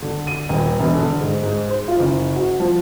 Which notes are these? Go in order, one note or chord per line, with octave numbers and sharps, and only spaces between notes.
D3
D#7
D#1
E1
D3
G#2
G#2
C5
F4
F#1
F#4
F3